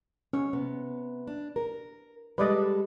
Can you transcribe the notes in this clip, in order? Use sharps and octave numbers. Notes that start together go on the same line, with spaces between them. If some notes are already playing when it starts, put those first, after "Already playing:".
C#4 C#5
C3 B3
D4
A#4
G3 G#3 A4 B4 D5 D#5